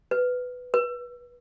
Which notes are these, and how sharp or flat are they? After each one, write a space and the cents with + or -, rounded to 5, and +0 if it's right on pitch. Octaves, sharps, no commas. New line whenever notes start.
B4 +10
B4 -25